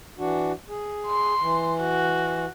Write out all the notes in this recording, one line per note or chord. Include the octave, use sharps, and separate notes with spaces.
E3 D4 F#4
G#4
C6
E3
F#4